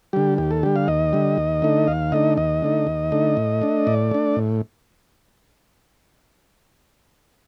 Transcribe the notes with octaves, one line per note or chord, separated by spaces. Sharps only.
D3 G3 G4
D#2 G4
A4
D3 G3 G4
F5
D#2 D#5
D3 G3
D#2
D3 A3 D#4
D#2 F5
D3 A3 D#4 D#5
D#2 D#5
D3 A3 D#4
D#2
D3 A3 D#4
A2
A3 D4
A2 D5
A3 D4
A2